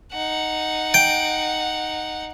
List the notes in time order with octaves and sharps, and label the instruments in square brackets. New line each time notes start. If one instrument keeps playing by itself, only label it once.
[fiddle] D#4 F#5
[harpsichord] G5